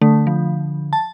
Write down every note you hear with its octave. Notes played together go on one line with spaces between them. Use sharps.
D3 A3
F3
A5